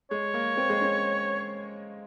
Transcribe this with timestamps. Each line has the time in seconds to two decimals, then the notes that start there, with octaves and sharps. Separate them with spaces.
0.11 G#3 C#5
0.34 A#3
0.57 C4
0.69 G#3
0.82 C#4